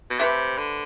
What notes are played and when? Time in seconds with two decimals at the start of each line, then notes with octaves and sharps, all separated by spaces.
0.10 B2
0.19 C3 A3 C4 G4 B4
0.58 D3